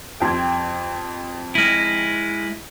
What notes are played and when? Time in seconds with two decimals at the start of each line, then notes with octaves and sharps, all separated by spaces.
0.20 F2 G4 G5 C6 G#6
1.55 G#3 E4 F6 A#6 D#7